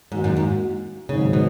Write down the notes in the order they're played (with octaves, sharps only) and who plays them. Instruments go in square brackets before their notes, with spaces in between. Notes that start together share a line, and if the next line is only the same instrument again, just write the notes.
[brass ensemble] D#2 D#3 A#3 D#4 F#4 [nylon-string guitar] G#2
[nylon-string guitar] F#2
G#2
[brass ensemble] G#1 G#2 F#3 [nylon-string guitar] C#3
[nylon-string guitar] B2